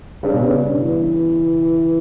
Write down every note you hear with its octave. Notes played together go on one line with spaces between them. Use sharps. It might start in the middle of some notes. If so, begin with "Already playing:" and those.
G2 C#3
B2
C#3
G2
E3